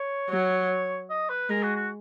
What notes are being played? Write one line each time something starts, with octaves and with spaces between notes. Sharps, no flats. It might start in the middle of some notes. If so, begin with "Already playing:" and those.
Already playing: C#5
F#3 C#5
D#5
B4
G#3 A#4
F#4
F#4